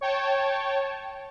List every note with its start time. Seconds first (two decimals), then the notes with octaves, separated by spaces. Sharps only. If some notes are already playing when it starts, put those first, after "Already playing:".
0.01 C#5 G5 A5